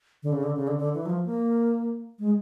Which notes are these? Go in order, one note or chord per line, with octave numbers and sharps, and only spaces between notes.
D3
C#3
D3
C#3
D3
D3
E3
F#3
F3
A#3
G#3